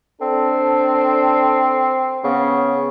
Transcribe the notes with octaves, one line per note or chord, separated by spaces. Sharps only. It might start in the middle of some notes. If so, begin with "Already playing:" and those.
C4 D4 A4
C#3 B3